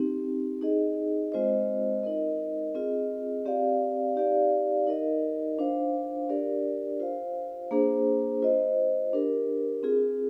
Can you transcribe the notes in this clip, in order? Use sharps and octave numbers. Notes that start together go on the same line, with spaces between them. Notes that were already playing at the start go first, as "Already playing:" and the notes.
Already playing: C4 D#4 G4
D#4 G#4 D#5
G#3 C4 F4 C5 D#5
D#4 A#4 D#5
C4 F4 G#4 D#5
C4 G4 D5 F5
D#4 G4 D5 F5
D#4 A#4 D#5
D4 F4 C5 F5
D4 G4 A#4 D5
F4 C5 F5
A#3 D4 G#4 C5
F4 C5 D#5
D4 G4 A#4
C4 F4 G#4